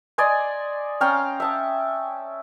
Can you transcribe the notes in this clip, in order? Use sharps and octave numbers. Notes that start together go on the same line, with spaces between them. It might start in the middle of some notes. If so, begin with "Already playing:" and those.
D5 D#5 G#5 C6
C#4 F5 G5 A#5
E5 A5 D#6